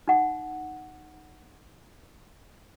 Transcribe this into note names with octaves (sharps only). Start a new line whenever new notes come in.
D#4 F#5